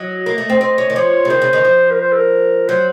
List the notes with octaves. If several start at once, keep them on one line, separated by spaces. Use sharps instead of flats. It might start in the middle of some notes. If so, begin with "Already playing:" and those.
Already playing: F#3 D#5
A#3
A3
C4
C4
C#4
D#3
F3 C#5
C#3
D#3 C5
C#3
D#3
F3
A#4
C5
A4
A#4
F#3 C5